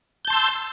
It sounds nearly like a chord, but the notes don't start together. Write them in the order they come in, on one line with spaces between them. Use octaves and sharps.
G6 A5 C6 E6